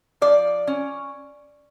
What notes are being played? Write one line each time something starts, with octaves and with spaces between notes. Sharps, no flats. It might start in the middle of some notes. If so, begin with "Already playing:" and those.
F3 D5
C#4